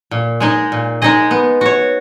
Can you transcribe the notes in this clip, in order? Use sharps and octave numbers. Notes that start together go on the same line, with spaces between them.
A#2
G#3 D#4 G#4 D#5
A#2
G#3 D#4 G#4 D#5
B3
F#4 C#5